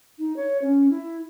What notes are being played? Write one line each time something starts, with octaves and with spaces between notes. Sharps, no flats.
D#4
C#5
C#4
E4